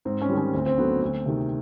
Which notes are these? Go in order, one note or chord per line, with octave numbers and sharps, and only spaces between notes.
G#2 C4
C#4
D#3 G3
C#4
D2 C4
C4
D3 F#3 B3
D2 C4
C3 D#3